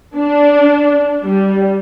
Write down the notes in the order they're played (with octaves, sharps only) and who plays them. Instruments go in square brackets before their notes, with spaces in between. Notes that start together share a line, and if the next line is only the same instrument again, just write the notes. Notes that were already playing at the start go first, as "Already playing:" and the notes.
[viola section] D4
G3